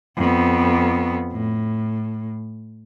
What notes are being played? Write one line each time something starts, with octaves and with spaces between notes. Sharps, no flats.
F2 B3
A2